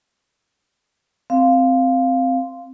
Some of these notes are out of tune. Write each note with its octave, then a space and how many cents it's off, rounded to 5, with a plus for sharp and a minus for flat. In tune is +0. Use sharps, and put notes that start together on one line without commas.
C4 -5 F5 +0